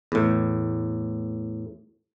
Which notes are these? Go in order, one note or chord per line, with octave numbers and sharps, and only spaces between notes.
E2 A2